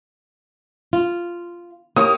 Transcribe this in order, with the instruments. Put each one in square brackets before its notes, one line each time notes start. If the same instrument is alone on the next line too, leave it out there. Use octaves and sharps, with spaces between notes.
[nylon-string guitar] F4
[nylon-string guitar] A#3 G4 C#5 [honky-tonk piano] D#6